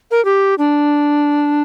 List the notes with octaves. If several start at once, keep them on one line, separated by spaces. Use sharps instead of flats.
A#4
G4
D4